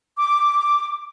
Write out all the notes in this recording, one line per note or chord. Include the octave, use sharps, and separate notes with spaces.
D6